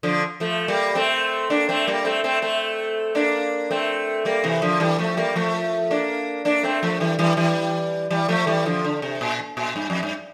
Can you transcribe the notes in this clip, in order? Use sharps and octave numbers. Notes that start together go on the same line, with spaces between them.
D3 F3
F3 A3
G3 A#3
A3 C4
A#3 D4
A3 C4
G3 A#3
A3 C4
A3 C4
A3 C4
A#3 D4
A3 C4
G3 A#3
C3 E3
D3 F3
E3 G3
F3 A3
G3 A#3
F3 A3
A#3 D4
A#3 D4
A3 C4
F3 A3
E3 G3
E3 G3
E3 G3
E3 G3
F3 A3
E3 G3
D3 F3
D3
C3
A#2
A#2
G2
F2
G2